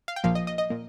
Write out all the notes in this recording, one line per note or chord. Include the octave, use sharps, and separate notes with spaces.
F5
G5
A#1 A#2 F3 A#3 F5
D#5
D#5
D#5
A#2 A#3